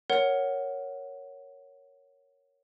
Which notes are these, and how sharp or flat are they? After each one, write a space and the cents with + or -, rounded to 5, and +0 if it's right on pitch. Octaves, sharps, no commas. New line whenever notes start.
A#4 +0 C#5 +0 F#5 +0